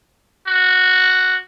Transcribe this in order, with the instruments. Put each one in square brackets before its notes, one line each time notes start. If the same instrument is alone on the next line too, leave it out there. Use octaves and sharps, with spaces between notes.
[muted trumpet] F#4